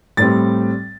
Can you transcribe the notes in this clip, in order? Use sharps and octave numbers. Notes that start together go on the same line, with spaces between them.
A2 G3 C4 A6